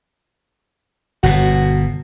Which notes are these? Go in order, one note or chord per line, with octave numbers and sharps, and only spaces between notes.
G1 B2 F#4